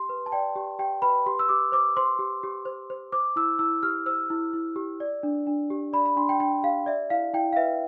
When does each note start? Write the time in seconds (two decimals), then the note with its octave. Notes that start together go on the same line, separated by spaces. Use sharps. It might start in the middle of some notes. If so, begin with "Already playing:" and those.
Already playing: G4 C6
0.09 B4
0.26 A5
0.32 D5 G5
0.56 G4
0.79 G4 G5
1.02 B4 B5
1.26 G4 C6
1.39 E6
1.49 G4 D6
1.72 C5 D6
1.97 C5 C6
2.19 G4
2.43 G4
2.66 C5
2.90 C5
3.12 C5 D6
3.36 E4 E6
3.59 E4 E6
3.83 G4 F6
4.06 C5 E6
4.30 E4
4.54 E4
4.76 G4
5.00 D5
5.23 D4
5.47 D4
5.70 G4
5.93 D5 B5
6.06 B5
6.16 D4 C6
6.29 G5
6.39 D4 G5
6.63 G4 F5
6.86 D5 E5
7.10 E4 F5
7.34 E4 G5
7.53 F5
7.56 B4 E5